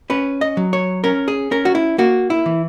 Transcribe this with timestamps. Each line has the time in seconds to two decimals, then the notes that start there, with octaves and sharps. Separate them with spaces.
0.10 C#4 B4
0.41 D#5
0.57 F#3
0.73 C#5
1.04 C#4 A#4
1.28 G#4
1.51 C#4 A#4
1.65 F#4
1.75 E4
1.98 A#3 F#4
2.30 E4
2.46 E3